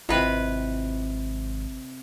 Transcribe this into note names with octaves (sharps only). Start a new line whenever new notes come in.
G#1 C3 E4 F4 B4 D#5